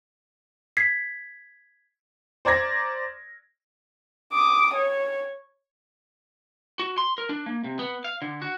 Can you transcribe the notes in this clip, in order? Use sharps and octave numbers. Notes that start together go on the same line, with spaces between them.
G#6 B6 C7
C5 D5 A#5 G#6 A#6
D6 D#6
C#5
F#4
C6
A#4
D4
A#3
C3
B3
F5
D3
F#4